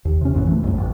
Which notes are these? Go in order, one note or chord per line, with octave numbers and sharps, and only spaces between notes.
D#2
C3 C#4
A#1 F#2 A2 E3
A3
C2 F#2
A1